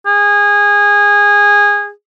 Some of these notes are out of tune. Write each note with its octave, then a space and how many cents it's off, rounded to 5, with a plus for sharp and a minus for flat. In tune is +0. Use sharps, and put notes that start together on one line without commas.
G#4 -20